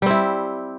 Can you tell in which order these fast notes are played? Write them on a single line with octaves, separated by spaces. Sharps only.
G3 C4 E4